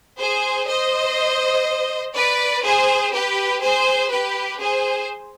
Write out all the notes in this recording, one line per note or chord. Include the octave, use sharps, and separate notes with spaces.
G#4 C5
C5 D#5
B4 D5
G#4 C5
G4 B4
G#4 C5
G4 B4
G#4 C5